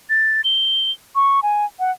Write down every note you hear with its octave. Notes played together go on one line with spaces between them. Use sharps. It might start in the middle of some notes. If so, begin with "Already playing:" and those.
A6
G7
C#6
G#5
F#5